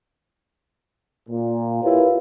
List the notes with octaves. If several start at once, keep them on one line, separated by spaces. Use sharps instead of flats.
A#2
E4 F4 G4 A#4 B4 C#5